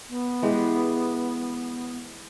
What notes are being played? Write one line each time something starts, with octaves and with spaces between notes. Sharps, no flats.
B3
E3 G#3 G4